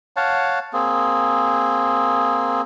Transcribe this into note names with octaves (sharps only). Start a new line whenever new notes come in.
C#5 F5 F#5 A5
A#3 C4 G#4